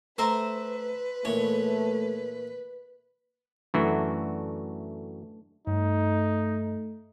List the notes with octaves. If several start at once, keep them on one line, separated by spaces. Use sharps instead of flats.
A3 B4 C5 E5 A#5
A#2 E3 A3 C#5
F#2 E3 A3 D4 F#4
G2 A3 D#4